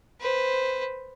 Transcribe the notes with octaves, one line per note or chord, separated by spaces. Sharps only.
B4 C5